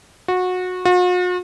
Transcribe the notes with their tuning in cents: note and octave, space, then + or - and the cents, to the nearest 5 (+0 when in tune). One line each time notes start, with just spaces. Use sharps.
F#4 -20
F#4 -45